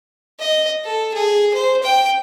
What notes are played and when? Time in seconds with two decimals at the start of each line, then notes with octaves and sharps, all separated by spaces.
0.39 D#5
0.84 A4
1.13 G#4
1.54 C5
1.83 G5